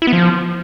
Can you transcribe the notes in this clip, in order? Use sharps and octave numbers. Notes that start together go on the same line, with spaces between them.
E4
B3
F3